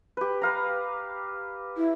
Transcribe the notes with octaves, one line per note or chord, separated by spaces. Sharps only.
G4 B4
B4 F5 A#5
E4